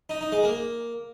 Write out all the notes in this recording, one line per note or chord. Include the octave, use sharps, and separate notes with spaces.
D#4
D#4
G#3
A#3